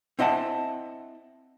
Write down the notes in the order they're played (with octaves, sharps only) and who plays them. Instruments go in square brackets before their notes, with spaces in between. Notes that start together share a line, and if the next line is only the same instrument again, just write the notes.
[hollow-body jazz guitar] C4 E4 D#5 F#5 A5